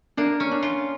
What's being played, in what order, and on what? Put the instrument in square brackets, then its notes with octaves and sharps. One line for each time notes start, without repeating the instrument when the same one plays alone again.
[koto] A#3 [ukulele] D4
[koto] C#4
[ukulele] D4
[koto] F4